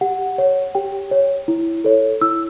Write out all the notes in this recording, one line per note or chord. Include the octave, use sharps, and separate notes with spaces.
G4 F#5
C#5
G4 G5
C#5
E4
A4 C#5
E4 E6